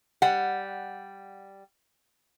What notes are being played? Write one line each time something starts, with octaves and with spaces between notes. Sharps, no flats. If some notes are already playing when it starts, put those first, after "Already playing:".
G3 F#5